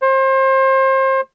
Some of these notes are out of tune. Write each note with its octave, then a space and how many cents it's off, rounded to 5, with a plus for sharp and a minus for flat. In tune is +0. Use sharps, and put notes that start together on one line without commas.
C5 +30